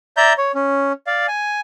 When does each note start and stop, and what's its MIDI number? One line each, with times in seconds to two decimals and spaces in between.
0.17 0.33 74
0.17 0.33 76
0.17 0.33 82
0.17 0.33 91
0.38 0.52 73
0.55 0.93 61
1.07 1.26 74
1.07 1.26 77
1.28 1.61 80